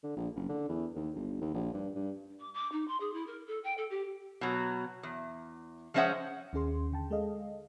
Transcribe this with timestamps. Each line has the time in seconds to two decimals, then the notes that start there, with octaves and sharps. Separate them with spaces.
0.03 D3
0.16 A#1
0.36 F#1
0.49 D3
0.69 E2
0.96 D#2
1.15 G1
1.41 D#2
1.54 A#1
1.74 G2
1.95 G2
2.40 D6
2.54 D6
2.72 D#4
2.88 C6
3.00 G#4
3.13 E4
3.27 A#4
3.47 A4
3.64 G5
3.77 A4
3.90 G4
4.41 B2 F#3
5.03 E2
5.94 F3 G#3 C#4 C5 E5 F#5
6.53 D#2 C#4 G#4 C6
6.92 D3 G5 A5
7.11 G#3 G#4 A4 D#5 F5